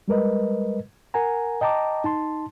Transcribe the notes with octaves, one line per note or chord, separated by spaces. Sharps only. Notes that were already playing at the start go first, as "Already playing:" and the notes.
G3 G#3 A#4 B4 D#5
A#4 F#5 G#5 A#5
D#5 G5 A5 A#5 D6
D#4 A5 C6